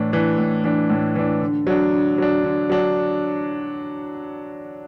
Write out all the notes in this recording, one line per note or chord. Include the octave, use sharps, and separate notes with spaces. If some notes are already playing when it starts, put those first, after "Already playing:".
Already playing: A2 E3 D4
E3 D4
A2
E3 D4
A2
E3 D4
D3
F#3 D4
D3
F#3 D4
D3
F#3 D4